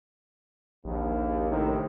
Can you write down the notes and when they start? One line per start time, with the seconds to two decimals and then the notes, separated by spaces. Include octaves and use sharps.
0.85 A#1 D#2
1.50 A2 C3 D#3